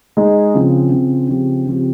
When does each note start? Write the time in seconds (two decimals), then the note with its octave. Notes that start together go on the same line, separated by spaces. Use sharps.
0.17 G#3 D#4 G#4
0.55 C#3 F3 C4
0.92 C#3 F3 C4
1.29 C#3 F3 C4 G4
1.67 C#3 F3 C4 G4